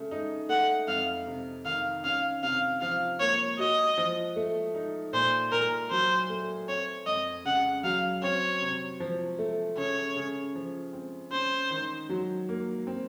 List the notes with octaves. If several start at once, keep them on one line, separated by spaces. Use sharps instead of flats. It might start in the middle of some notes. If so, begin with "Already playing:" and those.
Already playing: C#3 A3
D#4
A3 F#5
F2 F5
C3
D#3 F5
C#4 F5
C3 F5
F3 F5
A#3 C#5
F#4 D#5
F3
A3
D#4
A#2 C5
A#2 A#4
F#3 C5
A3
C4 C#5
F2 D#5
C#3 F#5
F#3 F5
C4 C#5
C3
F3
A3
C#3 C#5
C#3
F3
C4
C#4 C5
D#3
F#3
A#3
C4